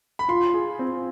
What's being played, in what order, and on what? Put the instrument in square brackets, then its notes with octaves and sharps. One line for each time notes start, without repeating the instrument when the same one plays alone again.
[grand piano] B5
[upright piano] F4 [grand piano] C6
[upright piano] G#4
C4